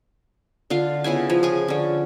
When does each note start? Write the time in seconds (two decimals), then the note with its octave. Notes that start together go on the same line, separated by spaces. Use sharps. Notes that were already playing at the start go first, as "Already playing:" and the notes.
0.70 D3 F4 F5
1.04 C#3 B3 E4 G#5
1.30 F3
1.43 G#4 G#5
1.68 D3 C#4